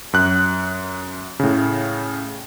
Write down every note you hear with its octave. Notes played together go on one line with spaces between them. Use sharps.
F#2 F#6
A2 C#3